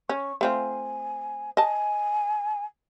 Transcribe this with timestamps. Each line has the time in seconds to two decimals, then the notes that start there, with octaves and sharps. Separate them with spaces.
0.09 C#4 C#6
0.41 A3 C4 F4 G#5
1.57 D#5 G#5 A5